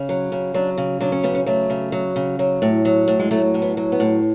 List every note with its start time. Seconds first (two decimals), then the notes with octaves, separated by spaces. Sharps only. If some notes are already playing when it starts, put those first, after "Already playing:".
Already playing: C#3
0.09 F#3
0.32 C#3
0.54 F#3 D4
0.77 C#3
1.00 F#3 D4
1.12 C#4
1.24 C#3 B3
1.35 C#4
1.46 F#3 A3
1.70 C#3
1.92 F#3
2.16 C#3
2.39 F#3
2.62 A2
2.85 F#3
3.08 A2
3.19 G#3
3.31 F#3 A3
3.54 A2
3.62 B3
3.77 F#3
3.92 B3
4.00 A2